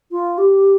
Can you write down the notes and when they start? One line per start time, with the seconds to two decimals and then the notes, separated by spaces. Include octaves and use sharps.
0.11 F4
0.37 G4